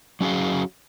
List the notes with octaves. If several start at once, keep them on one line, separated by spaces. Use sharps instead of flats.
F#3 C#4 F#4 G#4 F5